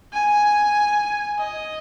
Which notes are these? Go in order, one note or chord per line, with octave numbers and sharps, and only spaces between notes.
G#5
D#5